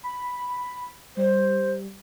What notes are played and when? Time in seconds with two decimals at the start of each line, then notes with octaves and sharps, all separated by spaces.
0.04 B5
1.17 G3 C5